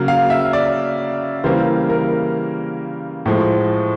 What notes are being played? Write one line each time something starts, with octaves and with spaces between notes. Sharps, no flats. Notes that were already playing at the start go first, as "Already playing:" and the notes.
Already playing: C#3 F#3 A#3
F5
E5
D5
C#3 E3 G3 A#3 C5
A#4
A2 F3 G#3